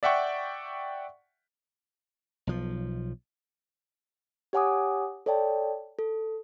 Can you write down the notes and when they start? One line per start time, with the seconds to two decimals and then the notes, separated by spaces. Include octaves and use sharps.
0.03 D5 E5 F#5 G5 C#6
2.47 B1 F3
4.53 G4 C#5 F#5 G#5 D6 D#6
5.26 A4 C#5 D5 G5 A5
5.99 A4